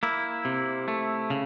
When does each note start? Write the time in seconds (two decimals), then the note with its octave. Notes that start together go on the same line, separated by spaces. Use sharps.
0.03 A#3 E4
0.45 C3
0.88 A3
1.30 C#3